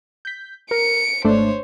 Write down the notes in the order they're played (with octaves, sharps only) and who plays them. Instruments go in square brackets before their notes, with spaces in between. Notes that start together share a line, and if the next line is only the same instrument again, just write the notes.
[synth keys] G6 B6
[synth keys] A#4 [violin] C#7 D7
[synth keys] G#1 A3 D4 [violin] C5 C#5